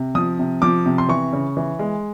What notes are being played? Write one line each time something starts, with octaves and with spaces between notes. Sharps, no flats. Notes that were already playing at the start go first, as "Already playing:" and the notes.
Already playing: C3
F3 D#6
C3
F3 D6
C3
C6
E3 C#6
C#3
E3
G#3